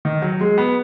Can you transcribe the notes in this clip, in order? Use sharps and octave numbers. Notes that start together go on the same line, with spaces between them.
D#3
F#3
G#3
B3